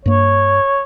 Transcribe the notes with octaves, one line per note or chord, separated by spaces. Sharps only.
G2 A#3 C#5